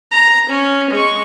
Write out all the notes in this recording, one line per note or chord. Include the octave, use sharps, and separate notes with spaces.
A#5
C#4
G#3 C#6